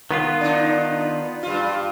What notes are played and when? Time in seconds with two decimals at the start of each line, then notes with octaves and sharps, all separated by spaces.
0.11 D#3 B3 F4
0.41 D4 D#4
1.43 G2 F4